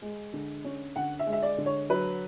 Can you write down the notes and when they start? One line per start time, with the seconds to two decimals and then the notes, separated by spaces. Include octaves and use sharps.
0.02 G#3
0.33 D3
0.64 C#4
0.96 D3 F#5
1.19 E5
1.27 G#3
1.33 E5
1.43 D5
1.58 D3
1.66 C#5
1.89 F#3 B4